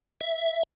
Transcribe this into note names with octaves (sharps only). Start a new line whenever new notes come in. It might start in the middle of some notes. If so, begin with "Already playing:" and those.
E5